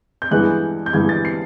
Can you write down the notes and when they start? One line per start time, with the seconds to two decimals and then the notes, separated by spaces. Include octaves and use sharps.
0.22 G6
0.31 G2 E3 G#3 B3 F#6
0.86 G6
0.93 G2 E3 G#3 B3 G#6
1.09 A6
1.25 C7